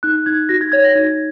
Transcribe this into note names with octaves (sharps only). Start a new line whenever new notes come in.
D#4 F#6
D#4 G#6
F#4 A#6
G#6
C#5 G#6
A#6
D#4 G#6